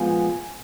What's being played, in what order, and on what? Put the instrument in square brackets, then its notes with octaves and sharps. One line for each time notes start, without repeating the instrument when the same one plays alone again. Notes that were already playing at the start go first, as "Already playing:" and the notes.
Already playing: [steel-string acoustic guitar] A#2 F3 G#3 B3 G#5